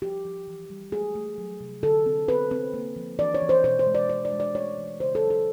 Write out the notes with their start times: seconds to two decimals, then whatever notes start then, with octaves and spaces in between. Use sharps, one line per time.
0.02 F3 G4
0.25 F3
0.48 E3
0.70 G3
0.92 A3 G#4
1.15 A3
1.38 F#3
1.60 C3
1.83 D3 A4
2.06 C4
2.28 C4 B4
2.51 C4
2.74 A#3
2.96 F3
3.19 E3 D5
3.34 C#5
3.42 E3
3.49 C5
3.64 B2 C5
3.79 C5
3.87 G#3
3.95 D5
4.09 E3 D5
4.25 D5
4.32 G#3
4.40 D5
4.55 A3 C#5
4.78 E3
5.00 C#3 C5
5.15 A4
5.23 F#3
5.30 A4